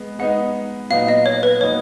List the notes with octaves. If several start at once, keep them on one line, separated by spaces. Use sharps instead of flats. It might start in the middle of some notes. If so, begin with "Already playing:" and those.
Already playing: G#3 B3
G#3 B3 D#4 F#5
A#2 F#3 B3 D#4 F5
D#5
C#5
B4
A#2 F#3 B3 D#4 C#5